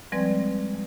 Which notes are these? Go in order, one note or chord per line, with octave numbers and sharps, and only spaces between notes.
F3 G3 G#3 C4 B4 D5